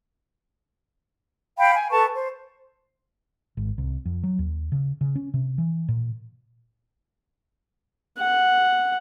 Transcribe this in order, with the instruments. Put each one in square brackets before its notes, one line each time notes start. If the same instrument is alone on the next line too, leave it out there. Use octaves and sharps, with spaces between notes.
[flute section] F5 G5 B5
G#5
A4 B4 A5 C#6
C5
[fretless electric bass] G#1
C2
F2
F#3
D#2
C#3
C#3
C#4
C3
E3
A#2
[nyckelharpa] F#5